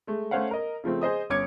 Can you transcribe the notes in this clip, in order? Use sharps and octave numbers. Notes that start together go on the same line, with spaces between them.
G#3 A3
A3 C#4 C5 C#5 F5 F#5
A#4 D#5
C#3 F3 A3 C4
G#4 C5 D#5 D#6
G1 C#4 D6 G#6 C#7